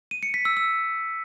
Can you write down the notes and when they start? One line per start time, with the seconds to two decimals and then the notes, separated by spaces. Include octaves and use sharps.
0.11 D#7
0.23 C#7
0.34 B6
0.45 E6
0.57 E6